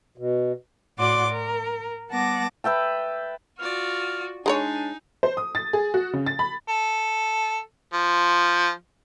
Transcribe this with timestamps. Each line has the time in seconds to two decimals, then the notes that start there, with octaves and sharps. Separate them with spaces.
0.18 B2
0.97 A2 F#4 D5 F#5 C6 D6
1.28 A#4
2.10 G3 B3 F#5 A5 D6 A#6
2.64 B4 E5 G5 A5
3.59 F4 F#4 D5 F6
4.46 G#3 D4 D#4 G#4 A#4 C#5
5.23 C5
5.37 D#6
5.55 A6
5.73 G#4
5.94 F#4
6.13 C#3
6.26 A6
6.39 B5
6.68 A4
7.93 F3